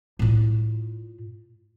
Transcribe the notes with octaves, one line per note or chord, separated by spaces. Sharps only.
A2 F4